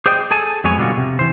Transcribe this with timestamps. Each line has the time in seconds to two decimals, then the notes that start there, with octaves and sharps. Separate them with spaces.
0.06 G#4 C5 D5 D#5 G5
0.31 G#4 A4 G#5 A5
0.64 F2 F#3 G#3 B3 C#5 G#5
0.78 B2 D3 G3 C4 F4 F#4
0.98 C3
1.19 E3 C5